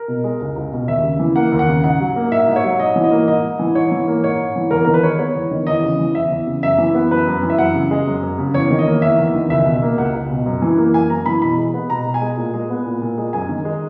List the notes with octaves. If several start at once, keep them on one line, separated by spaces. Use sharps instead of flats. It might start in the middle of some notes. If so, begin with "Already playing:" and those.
Already playing: A#4
B2
G#3
C#2
C#2
B2
D#2 E5
C#3
E3
A#3 F#5
D#2
F#5
C#3
G#2 F#5
F#3
A#3
G#2 E5
G#2
C#5
F#3
G#2 D#5
E3
D#5
A#3
G#2 D#5
G#2
E3
G#2 C#5
E3
A#3
G#2 C#5
G#2
E3
E2 A#4
D#3 A#4
B4
G#3 C#5
B3 C#5
E2
D#3
E2 D#5
C#3
E3
E2 E5
E2
C#3
F#2 E5
E3
B3
F#2 B4
F#2
E3
E5
F#2 F#5
C#3
G#3
F#2
F#2
C#3
E2 C#5
D#3
D#5
A#3
E2 E5
E2
D#3
C#2 E5
B2
A#3
C#2 F#5
C#2
B2
F#2
E3
A#3
F#2 G#5
F#2 A#5
E3 B5
B2 B5
G#3
B3
B2 A#5
B2
G#5
G#3
A#2
G#3
B3
A#2
A#2
G#3
F#2 G#5
D#3
G#3